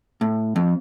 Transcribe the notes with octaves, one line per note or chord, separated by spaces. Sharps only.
A2
F2